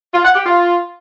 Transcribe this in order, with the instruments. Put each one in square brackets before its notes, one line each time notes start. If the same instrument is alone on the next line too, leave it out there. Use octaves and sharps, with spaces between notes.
[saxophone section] F4
F#5
G4
F4